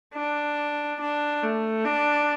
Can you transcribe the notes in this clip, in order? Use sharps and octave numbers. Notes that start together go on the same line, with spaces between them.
D4
D4
A3
D4